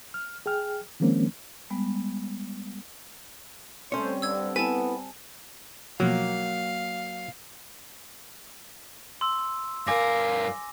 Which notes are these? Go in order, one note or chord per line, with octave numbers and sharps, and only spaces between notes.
F6
G#4 G5 F6
D#3 F3 G#3 A#3 C4 C#4
G3 G#3 B3
G3 A3 C4 C#4 C5 C#5
G2 D3 E6 G#6
B3 E4 A4 B4 G#5 A5
B2 F3 F#3 A#3 F5 F6
C6 E6
G2 A#4 F5 G#5 D6 A#6